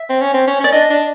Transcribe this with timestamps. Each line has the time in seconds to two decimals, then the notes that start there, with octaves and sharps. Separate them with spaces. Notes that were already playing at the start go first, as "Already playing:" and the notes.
Already playing: E5
0.10 C4
0.21 C#4
0.34 C4
0.47 C#4
0.60 C#4
0.64 D5
0.72 D4 D#5
0.90 D4